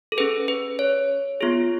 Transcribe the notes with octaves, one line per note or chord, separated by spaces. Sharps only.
A4
C#4 G#4 B4
B4
C#5
B3 F4 G#4